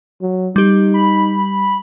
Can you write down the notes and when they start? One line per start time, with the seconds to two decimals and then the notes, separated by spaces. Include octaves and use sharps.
0.21 F#3
0.56 G3 D#4 G4
0.94 B5